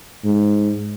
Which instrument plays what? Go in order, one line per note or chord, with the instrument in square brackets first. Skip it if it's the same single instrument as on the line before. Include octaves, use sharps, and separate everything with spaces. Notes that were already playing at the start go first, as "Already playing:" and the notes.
[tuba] G#2